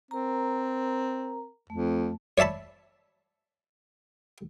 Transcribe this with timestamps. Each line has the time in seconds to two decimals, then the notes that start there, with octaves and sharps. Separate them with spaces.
0.11 C4 A#4 A#5
1.70 F2 A3
2.38 C#5 D5 E5 A5 B5